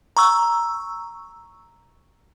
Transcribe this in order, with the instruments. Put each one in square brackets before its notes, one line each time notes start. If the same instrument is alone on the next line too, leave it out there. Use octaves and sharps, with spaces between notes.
[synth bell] A#5 C#6 E6